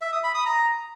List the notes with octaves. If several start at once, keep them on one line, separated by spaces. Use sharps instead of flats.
E5
D#6
B5
D#6
A#5